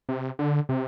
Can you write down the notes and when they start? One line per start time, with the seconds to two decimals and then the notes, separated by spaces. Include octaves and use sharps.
0.09 C3
0.39 D3
0.69 C3